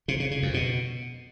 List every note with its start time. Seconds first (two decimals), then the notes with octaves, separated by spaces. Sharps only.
0.08 C3
0.20 C#3
0.31 C#3
0.43 F2
0.54 B2